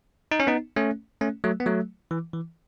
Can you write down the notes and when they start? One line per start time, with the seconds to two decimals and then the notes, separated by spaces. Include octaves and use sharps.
0.31 D#4
0.40 C#4
0.47 B3 D#4
0.76 A3 C#4
1.21 A3 C#4
1.44 F#3 A3
1.60 B3
1.66 F#3 A3
2.11 E3
2.33 E3